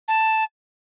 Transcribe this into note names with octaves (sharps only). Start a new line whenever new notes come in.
A5